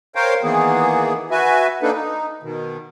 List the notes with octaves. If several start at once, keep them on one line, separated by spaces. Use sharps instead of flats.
A#4 C5 C#5 F5 G5
D#3 E3 A#3 B3 G#4
F#4 B4 E5 G#5
A#3 D4 D#4 A4 B4
D#4
B2 D#3